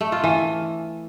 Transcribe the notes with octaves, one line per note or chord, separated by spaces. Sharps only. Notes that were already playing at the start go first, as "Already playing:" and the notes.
A3
F4
E3